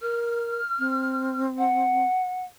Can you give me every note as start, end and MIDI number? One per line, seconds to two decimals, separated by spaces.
0.02 0.61 70
0.02 1.42 89
0.79 2.06 60
1.57 2.44 78